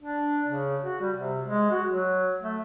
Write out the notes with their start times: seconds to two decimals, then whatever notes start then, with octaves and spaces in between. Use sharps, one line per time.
0.01 D4
0.47 C#3
0.82 F#4
1.01 G3
1.16 C3
1.46 G#3
1.71 F#4
1.87 F#3
2.43 A3